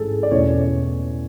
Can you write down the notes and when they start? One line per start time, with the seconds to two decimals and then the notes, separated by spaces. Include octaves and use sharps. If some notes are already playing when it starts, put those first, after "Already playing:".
Already playing: A1 G#2 E3 G#4 A4
0.23 D5
0.31 E2 B2 A3 C#4 C#5